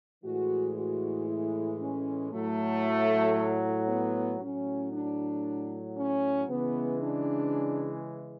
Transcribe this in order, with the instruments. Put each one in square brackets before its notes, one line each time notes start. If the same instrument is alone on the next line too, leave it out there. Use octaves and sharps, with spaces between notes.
[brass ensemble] A2 E3 G#3 F#4
F#4
E4
C#4
A2 F#3 A3
B3
A2 F#3 C#4
D4
C#4
C#3 E3 G#3 B3
D4